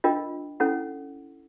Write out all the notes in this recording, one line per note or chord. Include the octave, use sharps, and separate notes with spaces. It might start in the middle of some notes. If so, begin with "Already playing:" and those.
D4 F4 A#4 D#5 G5
C#4 E4 A4 C#5 F#5